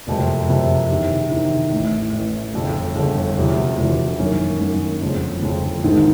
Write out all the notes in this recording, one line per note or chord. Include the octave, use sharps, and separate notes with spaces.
F#1 F2 C3 F3
F#1 F2 C3 F3
E2 C3 D#3
E2 C3 D#3
A1 A2 E3
A1 A2 E3
G1 F2 C#3
G1 F2 C#3
E1 E2 C3 F3
E1 E2 C3 F3
F#2 D#3 F#3 A#3 C#4
F#2 D#3 F#3 A#3 C#4
G1 F2 C#3 F3
G1 F2 C#3 F3
A#1 G#2 D#3 G#3 C4